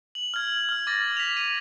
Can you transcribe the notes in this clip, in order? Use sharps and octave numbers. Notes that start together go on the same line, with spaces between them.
F#7
F6 G#6
F6
D6 A6 A#6
B6 F7
D#7